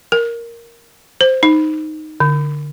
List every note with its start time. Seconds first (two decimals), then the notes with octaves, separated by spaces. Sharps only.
0.12 A#4
1.21 C5
1.43 D#4
2.20 D3